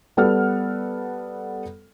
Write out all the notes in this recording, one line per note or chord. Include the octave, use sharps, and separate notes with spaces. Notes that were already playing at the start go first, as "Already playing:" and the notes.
G3 B3 A4 F#5 F6